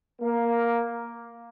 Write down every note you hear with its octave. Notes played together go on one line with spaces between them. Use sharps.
A#3